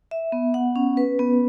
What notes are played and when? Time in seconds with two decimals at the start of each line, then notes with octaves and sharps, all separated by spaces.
0.11 E5
0.32 B3
0.54 F#5
0.76 C#4
0.97 B4
1.19 B3